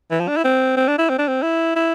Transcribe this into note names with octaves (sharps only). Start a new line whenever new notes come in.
E3
F3
D4
E4
C4
C4
D4
E4
C4
D4
C4
E4
E4